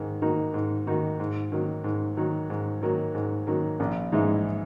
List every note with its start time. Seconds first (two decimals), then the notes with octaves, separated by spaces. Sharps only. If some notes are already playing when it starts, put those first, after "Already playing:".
Already playing: G#2 D#3 A#3
0.22 D#3 A#3 D#4 F#4
0.54 G#2
0.87 D#3 A#3 D#4 F#4
1.20 G#2
1.52 D#3 F#3 A#3
1.84 G#2
2.17 D#3 F#3 A#3
2.50 G#2
2.82 D#3 F#3 A#3
3.15 G#2
3.47 D#3 F#3 A#3
3.80 A#1
4.12 G#2 E3 G#3 D#4